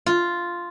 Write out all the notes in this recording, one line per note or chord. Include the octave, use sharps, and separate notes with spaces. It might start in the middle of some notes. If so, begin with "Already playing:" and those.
F4